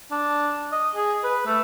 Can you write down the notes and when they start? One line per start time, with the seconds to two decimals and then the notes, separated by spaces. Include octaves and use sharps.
0.11 D4
0.72 D#5
0.95 G#4
1.24 B4
1.46 A3